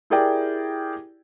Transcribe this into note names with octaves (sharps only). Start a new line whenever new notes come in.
E4 G4 G#4 A#4 D5 G5